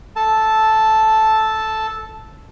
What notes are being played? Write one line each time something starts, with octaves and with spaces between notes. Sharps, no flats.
A4 A5